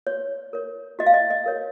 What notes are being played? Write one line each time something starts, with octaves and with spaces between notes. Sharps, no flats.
F#4 C#5
A#4 C#5
F#4 D#5
F5
D#5
D#5
A#4 C#5